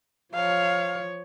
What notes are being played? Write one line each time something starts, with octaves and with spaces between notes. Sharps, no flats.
F3 C#5 F5